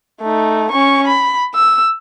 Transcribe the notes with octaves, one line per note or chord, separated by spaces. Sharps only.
A3 D#4
C#4 C#6
B5
E6